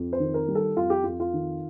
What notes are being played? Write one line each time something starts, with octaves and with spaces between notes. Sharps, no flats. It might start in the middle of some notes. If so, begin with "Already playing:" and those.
Already playing: F2
C5
D#3
A#4
G3
A4
F2 F4
G4
F2 F4
F4
D#3